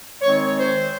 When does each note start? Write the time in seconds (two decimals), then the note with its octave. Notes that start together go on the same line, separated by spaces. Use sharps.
0.22 D#3 G#3 C4 D#4 C#5
0.44 C#5
0.56 C5